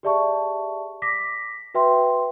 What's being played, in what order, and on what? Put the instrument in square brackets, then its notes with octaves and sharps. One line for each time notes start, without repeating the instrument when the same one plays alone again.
[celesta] G4 G#4 D5 E5 A5 C#6
D6 A#6 B6
F#4 B4 E5 G5 C6